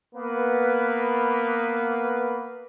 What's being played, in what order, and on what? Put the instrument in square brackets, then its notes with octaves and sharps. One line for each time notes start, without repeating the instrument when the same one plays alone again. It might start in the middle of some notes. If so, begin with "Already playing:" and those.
[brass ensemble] A#3 B3 B4